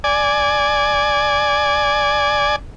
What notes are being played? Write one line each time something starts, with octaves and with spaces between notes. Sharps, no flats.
D5 G#5